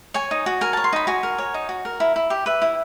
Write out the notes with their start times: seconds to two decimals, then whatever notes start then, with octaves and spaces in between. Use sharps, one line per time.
0.14 C#5 G#5
0.31 D#4
0.46 F#4
0.61 A#4 G#5
0.73 C#5 A5
0.84 C6
0.93 D#4 B5
1.07 F#4 G#5
1.23 A#4
1.38 C#5
1.54 D#4
1.69 F#4
1.85 A#4
2.00 E4
2.16 E4
2.30 G4
2.46 B4 E5
2.62 E4